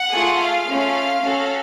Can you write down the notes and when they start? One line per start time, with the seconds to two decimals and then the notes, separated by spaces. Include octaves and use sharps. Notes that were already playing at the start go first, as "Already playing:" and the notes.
Already playing: F#5
0.10 A3 F4 G#4
0.38 F5
0.67 A3 C#4 F4
1.23 C#4 F#4 A4